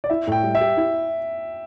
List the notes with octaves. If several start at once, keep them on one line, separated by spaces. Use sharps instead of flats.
D5
E4 E5
A2 G5
G3
E5
G4
E4